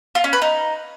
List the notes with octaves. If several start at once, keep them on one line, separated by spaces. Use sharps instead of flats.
F4
C#4
B4
D#4